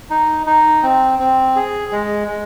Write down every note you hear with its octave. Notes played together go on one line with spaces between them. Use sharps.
D#4
D#4
C4
C4
G#4
G#3
G#3